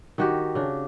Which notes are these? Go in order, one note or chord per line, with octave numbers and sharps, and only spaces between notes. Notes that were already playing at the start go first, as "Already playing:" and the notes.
D#3 F#4 G4
C#3 D4